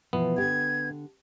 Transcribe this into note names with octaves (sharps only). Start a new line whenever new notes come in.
B2 E3 F3 B3
D3 G4 G#6